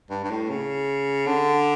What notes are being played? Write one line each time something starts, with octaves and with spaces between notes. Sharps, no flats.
G2
G2
A2
C#3
D3